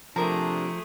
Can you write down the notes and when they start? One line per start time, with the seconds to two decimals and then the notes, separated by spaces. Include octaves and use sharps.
0.16 C3 F3 A3 D4 G#4 A#4 A#5